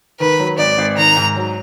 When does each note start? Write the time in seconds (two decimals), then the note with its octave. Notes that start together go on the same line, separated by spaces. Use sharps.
0.20 D#3 B4
0.39 F#3
0.59 G#1 D5
0.78 G#1
0.97 D#3 A#5
1.16 G#2
1.36 F#3